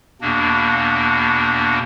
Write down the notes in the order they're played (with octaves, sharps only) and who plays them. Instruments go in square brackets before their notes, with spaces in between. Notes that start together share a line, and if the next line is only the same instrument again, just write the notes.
[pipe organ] E2 B2 A#3 D4